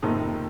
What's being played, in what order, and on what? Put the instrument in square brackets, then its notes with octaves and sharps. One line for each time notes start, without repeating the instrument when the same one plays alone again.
[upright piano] F#1 F2 C3 D#3 D#4